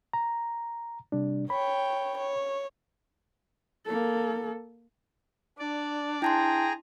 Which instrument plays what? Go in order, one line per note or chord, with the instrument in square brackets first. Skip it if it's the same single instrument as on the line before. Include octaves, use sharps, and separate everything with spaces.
[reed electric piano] A#5
C3 G3 D4
[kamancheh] C#5 G5 [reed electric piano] B5
[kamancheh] C#5
[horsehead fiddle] A#3 A4
[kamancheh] D4 [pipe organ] D5
[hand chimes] E4 A5 C6 [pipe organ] G#4 A#5 [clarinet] G5